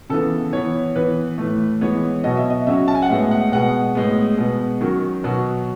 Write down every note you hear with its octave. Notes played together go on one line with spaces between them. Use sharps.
C#3 E3 B3 A4
E3 B3 C#5
E3 B3 B4
A2 E3 A3
E3 G#3 B3 C#5
B2 F#3 B3 D#5
E5
D#5
C#3 F#3 C#4 E5
A5
G#5
F#5
A2 G#3 B3 E5
F#5
B2 G#3 B3 F#5
A2 G#3 B3
B2 G#3 B3
D#3 F#3 C#4
B2 F#3 B3